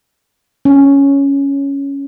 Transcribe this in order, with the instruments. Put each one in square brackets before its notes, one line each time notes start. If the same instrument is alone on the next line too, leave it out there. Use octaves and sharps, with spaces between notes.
[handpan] C#4